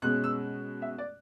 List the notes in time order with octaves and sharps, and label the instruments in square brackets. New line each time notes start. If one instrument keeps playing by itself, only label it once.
[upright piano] B2 G#3 C#4 F#6
E6
E5
D5